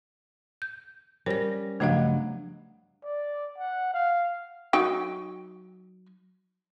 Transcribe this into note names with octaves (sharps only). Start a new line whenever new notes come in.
G6
G3 C#4 A#4 C5 A#6
G2 C#3 F3 F#3 A3 B3 D#5 F5
D5
F#5
F5
F#3 D#4 G5